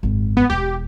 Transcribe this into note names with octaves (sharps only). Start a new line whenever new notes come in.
G#1 F#2
B3
E1 E2 G4